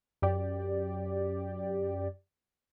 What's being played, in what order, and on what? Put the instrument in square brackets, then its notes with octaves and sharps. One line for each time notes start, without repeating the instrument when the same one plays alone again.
[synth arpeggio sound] F#2 G4 D5